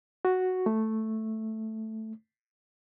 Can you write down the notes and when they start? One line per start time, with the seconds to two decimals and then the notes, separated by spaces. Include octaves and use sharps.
0.25 F#4
0.66 A3